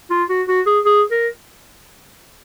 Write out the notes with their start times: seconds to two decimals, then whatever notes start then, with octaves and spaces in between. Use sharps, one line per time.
0.10 F4
0.29 F#4
0.48 F#4
0.66 G#4
0.85 G#4
1.11 A#4